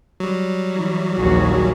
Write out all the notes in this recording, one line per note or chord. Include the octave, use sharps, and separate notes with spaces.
F#3 G3
E3
A#1 D#2 F3 F#4 G#4